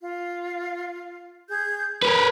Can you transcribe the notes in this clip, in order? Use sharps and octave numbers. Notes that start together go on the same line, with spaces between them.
F4
G#4 G6
G#4 A#4 B4 C#5